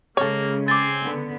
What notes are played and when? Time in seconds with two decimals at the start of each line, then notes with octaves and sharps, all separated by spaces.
0.17 C#3 G#3 A#3 A4 C#5
0.68 C4 G#5 C6 D6 A6
1.03 D3 B3